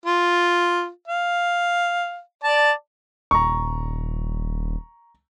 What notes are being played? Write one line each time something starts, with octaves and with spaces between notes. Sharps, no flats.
F4
F5
D5 A5
D#1 A#5 C#6